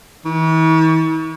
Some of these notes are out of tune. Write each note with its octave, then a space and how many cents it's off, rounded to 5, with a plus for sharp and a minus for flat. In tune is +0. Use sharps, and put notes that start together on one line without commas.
E3 -45